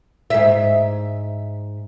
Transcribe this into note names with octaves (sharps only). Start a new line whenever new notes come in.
G#2 E5